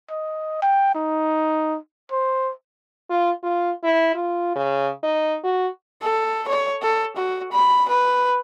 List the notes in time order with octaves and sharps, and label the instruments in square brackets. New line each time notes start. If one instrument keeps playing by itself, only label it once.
[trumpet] D#5
G5
D#4
C5
[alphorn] F4
F4
E4
F4
C#3
D#4
F#4
[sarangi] A4
C#5
A4
F#4
B5
B4